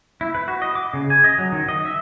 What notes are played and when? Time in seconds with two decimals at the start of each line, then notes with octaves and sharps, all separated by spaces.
0.21 E4
0.35 B4
0.48 F#4
0.62 D#5
0.75 D6
0.94 C#3
1.10 G#5
1.24 D#5
1.38 F#3
1.52 D#3
1.69 D#5
1.85 E5